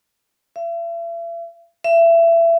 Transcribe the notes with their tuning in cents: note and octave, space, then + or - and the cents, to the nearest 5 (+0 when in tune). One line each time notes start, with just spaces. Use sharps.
E5 +40
E5 +25